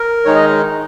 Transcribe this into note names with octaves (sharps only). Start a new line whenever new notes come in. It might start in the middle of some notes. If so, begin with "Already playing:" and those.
Already playing: A#4
D#3 G#3 D#4 C#5
D#5